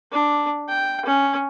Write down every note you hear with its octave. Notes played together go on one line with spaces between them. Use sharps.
D4
G5
C#4